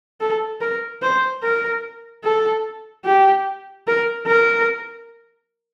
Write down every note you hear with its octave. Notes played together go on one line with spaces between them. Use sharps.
A4
A#4
C5
A#4
A4
G4
A#4
A#4